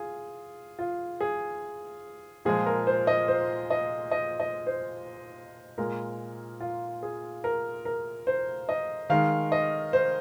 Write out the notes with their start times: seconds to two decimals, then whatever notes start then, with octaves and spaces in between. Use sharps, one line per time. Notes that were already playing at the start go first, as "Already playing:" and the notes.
Already playing: F4 G#4
0.79 F4
1.21 G#4
2.45 A#2 F3 G#3 G#4
2.66 A#4
2.87 C5
3.07 D#5
3.28 C5
3.70 D#5
4.11 D#5
4.40 D#5
4.67 C5
5.78 A#2 G#3 A#4
6.61 F4
7.03 G#4
7.44 A#4
7.85 A#4
8.27 C5
8.69 D#5
9.10 D#3 G#3 F5
9.52 D#5
9.93 C5